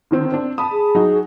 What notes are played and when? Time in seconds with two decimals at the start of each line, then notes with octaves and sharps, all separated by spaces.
0.11 D3 D#3 C4
0.33 C4 D4
0.58 A5 B5 D#6
0.72 G#4
0.95 F#3 D#4 F#4